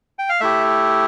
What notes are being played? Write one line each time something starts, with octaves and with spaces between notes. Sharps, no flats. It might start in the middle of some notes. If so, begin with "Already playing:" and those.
G5
F5
A3 E4 G4 E5